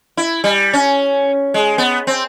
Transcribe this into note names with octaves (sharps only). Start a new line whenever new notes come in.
E4
G3
C#4
G#3
B3
C4